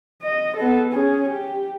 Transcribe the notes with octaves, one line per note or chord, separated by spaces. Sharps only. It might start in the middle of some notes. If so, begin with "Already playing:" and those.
D#5
B3 A4
C#4 G#4
G4